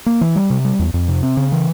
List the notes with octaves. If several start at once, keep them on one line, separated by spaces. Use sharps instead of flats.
A#3
E3
G3
C3
G3
E2
F2
C3
C4
C#3
E3